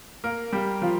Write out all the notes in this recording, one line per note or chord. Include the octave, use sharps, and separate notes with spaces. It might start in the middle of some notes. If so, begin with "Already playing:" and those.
A#3 A#4
G3 G4
F3 F4